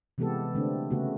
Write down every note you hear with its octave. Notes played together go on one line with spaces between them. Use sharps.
C3 E3 G#3 B3 G4 A4
D3 A3 C4 D4
C#3 A3 B3 F#4